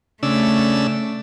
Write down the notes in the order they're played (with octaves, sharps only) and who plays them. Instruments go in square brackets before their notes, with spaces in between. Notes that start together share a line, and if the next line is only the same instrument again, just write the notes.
[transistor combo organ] C#3 D4 E6 [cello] A3